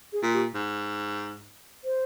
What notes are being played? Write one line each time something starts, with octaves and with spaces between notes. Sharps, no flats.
G#4
A#2
G4
G#2
C5